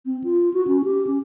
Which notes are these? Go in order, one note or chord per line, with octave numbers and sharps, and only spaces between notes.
C4
F4
F#4
C#4
G4
C#4